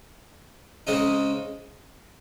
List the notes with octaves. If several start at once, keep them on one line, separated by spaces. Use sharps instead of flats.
C#3 G#3 C4 D#4